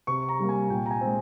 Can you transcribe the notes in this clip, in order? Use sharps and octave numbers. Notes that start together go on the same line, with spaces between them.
C3 C#6
A#5
G3 A#3
G#5
A#2 G5
A#5
G#5
G#3 C4